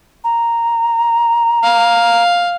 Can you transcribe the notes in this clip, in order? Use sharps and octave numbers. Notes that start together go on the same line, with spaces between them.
A#5
F5